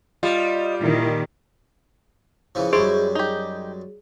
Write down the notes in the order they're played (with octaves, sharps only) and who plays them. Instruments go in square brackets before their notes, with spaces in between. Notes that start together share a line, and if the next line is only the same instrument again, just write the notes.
[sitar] G3 [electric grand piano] F4 [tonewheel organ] D#5
[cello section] A#2 D#3 [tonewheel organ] E4
[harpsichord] C#3 E3 F3
[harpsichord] F#2 G3 G#3 [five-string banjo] E4 C5 [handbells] G#4
[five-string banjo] D#4 G4